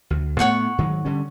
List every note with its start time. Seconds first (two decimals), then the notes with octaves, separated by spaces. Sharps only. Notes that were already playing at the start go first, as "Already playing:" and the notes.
0.10 D2
0.39 A2 A3 B3 C#5 F#5 C#6
0.78 G#2 D#3 F#3
1.05 D3 G3 C#4